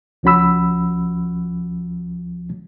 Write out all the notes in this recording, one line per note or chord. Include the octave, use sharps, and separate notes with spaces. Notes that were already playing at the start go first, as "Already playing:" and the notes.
C#2 F3 C#4 F#4 B5 E6